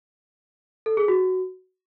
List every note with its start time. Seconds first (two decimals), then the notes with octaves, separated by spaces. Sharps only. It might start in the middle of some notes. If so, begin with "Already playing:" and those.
0.86 A4
0.97 G#4
1.08 F#4